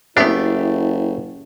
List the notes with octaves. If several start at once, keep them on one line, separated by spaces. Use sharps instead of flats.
F#1 A3 B3 D4 E4 G4